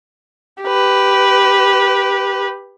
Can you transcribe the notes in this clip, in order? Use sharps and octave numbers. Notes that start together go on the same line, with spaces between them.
G4 B4